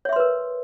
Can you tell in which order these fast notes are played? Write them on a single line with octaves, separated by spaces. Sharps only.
C#5 E5 C6 B4 A#4